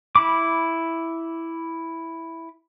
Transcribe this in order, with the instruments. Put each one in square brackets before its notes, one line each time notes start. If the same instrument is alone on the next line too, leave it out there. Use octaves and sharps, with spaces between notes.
[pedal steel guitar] E4 B5 D6